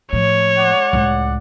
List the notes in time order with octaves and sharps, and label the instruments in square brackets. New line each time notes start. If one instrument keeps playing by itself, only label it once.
[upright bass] A2 F3 [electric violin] C#5
[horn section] G#3 D5 F#5
[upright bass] C#2 A2